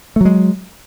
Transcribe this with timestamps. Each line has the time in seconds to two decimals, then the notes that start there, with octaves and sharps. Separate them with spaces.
0.16 A3
0.21 F#3
0.25 G#3